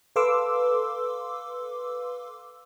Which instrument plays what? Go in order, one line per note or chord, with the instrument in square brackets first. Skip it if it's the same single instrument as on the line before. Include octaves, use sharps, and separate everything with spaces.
[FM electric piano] A4 B4 F5 C6 D6 E6